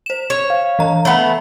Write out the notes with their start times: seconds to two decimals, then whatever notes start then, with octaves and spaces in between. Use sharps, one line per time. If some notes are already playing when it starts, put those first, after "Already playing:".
0.06 C5 E7
0.30 C#5
0.50 F5
0.79 E3 A#5
1.05 A3 B3 C#5 B5